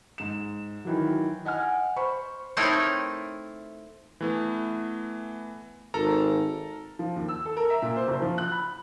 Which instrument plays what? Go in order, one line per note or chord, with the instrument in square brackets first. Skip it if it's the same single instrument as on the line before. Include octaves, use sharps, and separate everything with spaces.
[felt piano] G#2 E7
D#3 E3 F#3
D#5 F#5 G#5 F6
C5 B5 C#6
[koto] A3 C4 D#4 E4 A#4 C#5
[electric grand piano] E3 A3 B3
[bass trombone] G#1 [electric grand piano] A4 A#4 A#5
[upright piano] F3
D#2
E6
A4
A#4
E5
A#2
C5
F#1
F3
F#6
B5